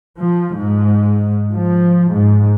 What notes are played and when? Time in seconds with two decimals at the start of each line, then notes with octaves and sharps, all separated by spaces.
0.19 F3
0.56 G#2
1.52 F3
2.12 G#2